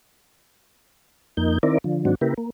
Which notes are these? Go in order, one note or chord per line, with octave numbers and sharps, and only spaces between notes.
F2 A#3 D#4 G6
D#3 C4 E4 A#4 D5
D3 F3
G#2 D#3 F#3 C4 D4 F#4
C#3 A#3 E4 G4 A#4 B4
A#3